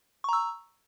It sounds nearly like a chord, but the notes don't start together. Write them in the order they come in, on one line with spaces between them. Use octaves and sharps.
C#6 A#5 E6